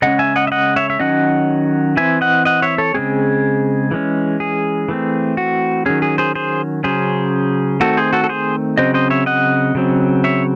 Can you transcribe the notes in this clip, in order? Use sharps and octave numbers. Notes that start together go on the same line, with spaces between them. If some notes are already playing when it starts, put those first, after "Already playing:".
C#3 G#3 C#4 D#5 F#5
E5 G#5
D#5 F#5
E5
D#5 F#5
C#5 E5
E5
D#3 F#3 C#4 D#5 F#5
E3 C4 E5 G#5
D#5 F#5
D#5 F#5
C#5 E5
A4 C#5
C#3 G#3 C4 G#4
E3 G#3 C#4
G#4
E3 A3 C4
F#4
D#3 F#3 C#4 G#4
G#4
G#4 C5
G#4 C5
C#3 F#3 C#4 G#4 C5
D#3 A3 C4 F#4 A4
G#4 C5
F#4 A4
A4
G#4 C5
C#3 F#3 C4 C5 D#5
C5 D#5
C#5 E5
D#5 F#5
C#3 F#3 C4
C#5 E5